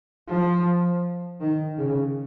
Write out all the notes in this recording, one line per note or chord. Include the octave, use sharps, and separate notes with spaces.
F3
D#3
C#3